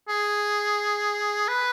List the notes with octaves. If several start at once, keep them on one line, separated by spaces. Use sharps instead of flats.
G#4
B4